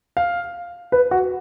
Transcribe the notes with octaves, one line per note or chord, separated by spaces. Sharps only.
F5
B4
F#4